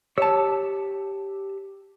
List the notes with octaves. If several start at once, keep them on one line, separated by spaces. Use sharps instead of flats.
G4 C#5 A5 E6